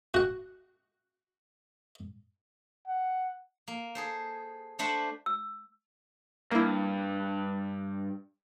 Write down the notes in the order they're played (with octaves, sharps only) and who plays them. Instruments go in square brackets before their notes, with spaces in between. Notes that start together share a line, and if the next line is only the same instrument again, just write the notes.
[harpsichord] F#4 F#5
[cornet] F#5
[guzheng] A#3
G#4 A4 C5
A3 D4 C5 E5 F#5
[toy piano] E6
[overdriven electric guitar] G2 [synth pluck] A#3 E4